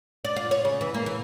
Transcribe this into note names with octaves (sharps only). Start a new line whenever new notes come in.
D5
F4
C#5
C#3
E3
A#3
E3